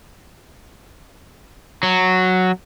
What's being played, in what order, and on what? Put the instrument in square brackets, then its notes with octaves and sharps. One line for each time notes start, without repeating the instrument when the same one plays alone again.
[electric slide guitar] F#3